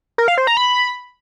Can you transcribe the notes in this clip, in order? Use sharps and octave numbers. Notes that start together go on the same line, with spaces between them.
A#4
F5
C5
A#5
B5